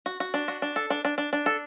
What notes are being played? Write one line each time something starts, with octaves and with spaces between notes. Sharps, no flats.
F#4
F#4
D4
F#4
D4
A4
D4
D4
D4
D4
A4